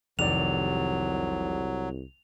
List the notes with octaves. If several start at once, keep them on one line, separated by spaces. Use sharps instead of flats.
F1 C2 D#3 F#3 D5 F7